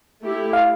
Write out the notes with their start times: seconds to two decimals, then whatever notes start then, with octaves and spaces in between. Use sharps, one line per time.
0.21 A3 E4 G4
0.53 F5